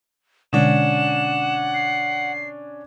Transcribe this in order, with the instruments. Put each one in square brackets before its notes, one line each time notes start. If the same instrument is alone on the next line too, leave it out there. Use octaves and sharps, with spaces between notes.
[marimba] B2 D3 G#3 [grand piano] C#4 D4 [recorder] F#5 [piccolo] E7
[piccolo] C7